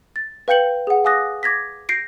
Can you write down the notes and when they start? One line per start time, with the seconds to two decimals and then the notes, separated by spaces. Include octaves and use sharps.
0.16 A6
0.48 B4 F5 G5 G6 C#7 F#7
0.87 G#4 F#5
1.04 F5 G#5 D6 D#6 F#6 A#6
1.43 D6 G#6 A#6 B6
1.89 G6 A#6 C7 D7